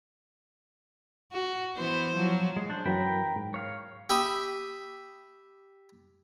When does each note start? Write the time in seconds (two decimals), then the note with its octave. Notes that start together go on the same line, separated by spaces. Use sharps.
1.32 F#4
1.77 E3 B3 C5
2.16 F3 F#3
2.57 G#3
2.70 D4 C5
2.86 F#2 E3 F#3 A#4 G5 B5
3.36 G#2
3.54 C#5 F5
4.10 G4 E5 B5 D#6